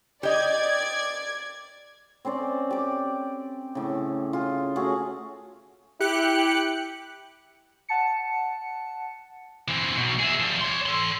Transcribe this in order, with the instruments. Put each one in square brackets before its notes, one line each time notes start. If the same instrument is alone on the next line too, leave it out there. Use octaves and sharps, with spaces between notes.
[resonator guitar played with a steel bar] G4 D#5 [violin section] D5 G#6
[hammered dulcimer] C4 C#4 C5 D5
G4 D6
A2 C#3
F4 G#4
A3 C#4 F#4 G#4
[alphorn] E4 [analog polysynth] G4 F#6 C#7
[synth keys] F#5 A5 C#7
[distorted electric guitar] E3 C4
B2 F#3
G#4 E5
F3 G3
C#5 C6
A4 C6